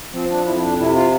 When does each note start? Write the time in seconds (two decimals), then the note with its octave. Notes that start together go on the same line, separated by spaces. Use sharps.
0.13 F3 C4
0.30 D4
0.46 F2 E4
0.56 E4
0.62 D4
0.79 C3 E4
0.95 F4